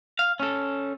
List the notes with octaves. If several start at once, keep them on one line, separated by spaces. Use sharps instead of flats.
F5
C#4 A4